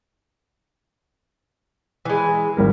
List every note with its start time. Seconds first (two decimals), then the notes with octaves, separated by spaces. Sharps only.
2.05 E3 G#3
2.57 G#1 G3 A#4